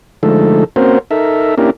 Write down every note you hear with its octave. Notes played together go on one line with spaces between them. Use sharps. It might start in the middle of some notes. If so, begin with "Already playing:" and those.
D3 F3 G#3 A3 D#4 A4
A#3 C4 C#4 F#4 A#4 C5
D#4 A4 A#4 E5
A#3 C#4 D4 E4 G4 A#4